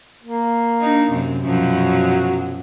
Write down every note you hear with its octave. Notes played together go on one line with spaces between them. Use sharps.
A#3
D4 D#4
F#2 C3
F#2 B2 F3 F#3